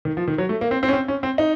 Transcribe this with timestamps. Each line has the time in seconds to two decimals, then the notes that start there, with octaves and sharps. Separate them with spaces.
0.05 D#3
0.17 F3
0.28 D#3
0.38 F#3
0.49 A3
0.61 A#3
0.71 C4
0.83 C4
0.89 C#4
0.93 C4
1.08 C#4
1.23 C4
1.38 D#4